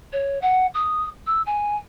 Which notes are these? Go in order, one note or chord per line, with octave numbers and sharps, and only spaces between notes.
C#5
F#5
D#6
E6
G#5